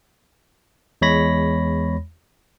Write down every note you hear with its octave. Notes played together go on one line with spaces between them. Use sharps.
E2 G#3 C#5 B5 A#6